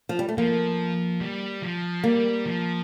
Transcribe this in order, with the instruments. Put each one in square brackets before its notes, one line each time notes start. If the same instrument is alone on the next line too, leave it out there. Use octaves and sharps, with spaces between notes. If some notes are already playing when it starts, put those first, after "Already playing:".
[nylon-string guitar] F3
G3
A3
[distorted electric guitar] F3 [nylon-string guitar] A#3
[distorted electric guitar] G3
F3
[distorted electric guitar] G3 [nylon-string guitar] A#3
[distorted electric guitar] F3